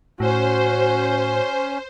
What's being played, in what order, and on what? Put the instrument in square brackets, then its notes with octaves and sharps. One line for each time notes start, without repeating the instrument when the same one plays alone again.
[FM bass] A2 [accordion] C#4 [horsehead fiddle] F#4 [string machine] C5